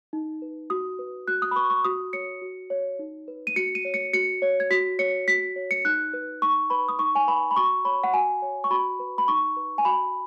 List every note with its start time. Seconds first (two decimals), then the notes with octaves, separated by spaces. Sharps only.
0.13 D#4
0.42 B4
0.70 F#4 D#6
0.99 B4
1.27 F#4 F#6
1.42 D#6
1.51 B5
1.56 B4 C#6
1.70 C#6
1.84 F#4 D#6
2.13 C#5 C#7
2.42 F#4
2.70 C#5
2.99 D#4
3.28 B4
3.47 D#7
3.56 F#4 C#7
3.75 D#7
3.85 C#5
3.94 C#7
4.13 F#4 C#7
4.42 C#5
4.60 G#6
4.70 F#4 B6
4.99 C#5 C#7
5.28 F#4 B6
5.56 C#5
5.71 C#7
5.85 D#4 F#6
6.13 B4
6.42 D#4 C#6
6.70 B4 B5
6.88 D#6
6.99 D#4 C#6
7.15 G#5
7.28 B4 B5
7.51 B5
7.56 F#4 C#6
7.85 C#5 B5
8.04 F#5
8.13 F#4 G#5
8.42 C#5
8.64 C#6
8.71 F#4 B5
9.00 B4
9.18 B5
9.28 D#4 C#6
9.57 B4
9.78 G#5
9.85 F#4 B5